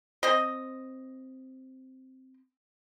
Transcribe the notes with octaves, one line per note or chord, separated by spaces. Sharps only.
C4 D#5